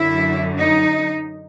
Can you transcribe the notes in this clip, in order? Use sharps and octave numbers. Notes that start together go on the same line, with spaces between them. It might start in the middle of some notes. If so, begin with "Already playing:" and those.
Already playing: F#2 D3 E4
D#4